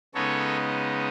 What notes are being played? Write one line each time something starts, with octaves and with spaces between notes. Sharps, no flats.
C#3 G#3 B3 D#4 A4 C#5